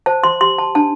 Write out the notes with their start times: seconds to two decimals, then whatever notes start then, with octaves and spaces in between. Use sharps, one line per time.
0.06 C5 A5
0.24 C6
0.41 G4 C6
0.58 A5
0.75 D4 A5